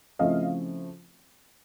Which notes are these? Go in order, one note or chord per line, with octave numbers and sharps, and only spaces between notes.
C#3 F3 A3 C4 E4 D#5 F5